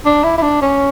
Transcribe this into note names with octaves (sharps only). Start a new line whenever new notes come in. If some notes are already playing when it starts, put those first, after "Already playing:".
D4
E4
E4
D4
C#4